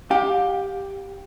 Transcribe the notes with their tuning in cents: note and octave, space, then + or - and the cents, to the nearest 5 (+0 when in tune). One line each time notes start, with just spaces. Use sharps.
G4 +5 F5 +40